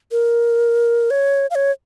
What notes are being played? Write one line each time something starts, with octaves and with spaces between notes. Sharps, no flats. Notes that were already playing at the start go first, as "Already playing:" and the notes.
A#4
C#5
F5
C#5